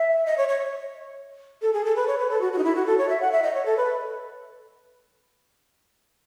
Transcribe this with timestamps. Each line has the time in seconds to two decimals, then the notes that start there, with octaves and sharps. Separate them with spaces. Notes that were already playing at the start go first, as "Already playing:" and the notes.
Already playing: E5
0.26 D#5
0.37 C#5
0.49 C#5
1.62 A4
1.73 G#4
1.85 A4
1.96 B4
2.07 C#5
2.19 B4
2.30 A4
2.41 F#4
2.53 F#4
2.58 D#4
2.64 E4
2.75 F#4
2.86 A4
2.98 C#5
3.09 E5
3.21 F#5
3.32 E5
3.43 D#5
3.54 C#5
3.66 A4
3.77 B4